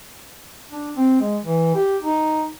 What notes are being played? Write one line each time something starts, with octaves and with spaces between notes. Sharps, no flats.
D4
C4
G#3
E3
G4
D#4